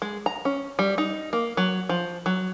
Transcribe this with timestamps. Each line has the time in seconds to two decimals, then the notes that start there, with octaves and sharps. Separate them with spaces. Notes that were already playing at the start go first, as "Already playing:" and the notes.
0.02 G#3
0.26 A#5
0.45 C#4
0.79 G3
0.98 D#4
1.33 A#3
1.57 F#3
1.89 F3
2.26 F#3